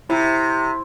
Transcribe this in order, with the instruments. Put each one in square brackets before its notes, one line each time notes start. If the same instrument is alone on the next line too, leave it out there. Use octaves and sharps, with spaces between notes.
[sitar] C3 [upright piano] E4